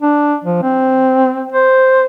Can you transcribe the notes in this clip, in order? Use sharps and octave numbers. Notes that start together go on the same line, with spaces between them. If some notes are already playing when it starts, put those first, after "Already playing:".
D4
F3
C4
C5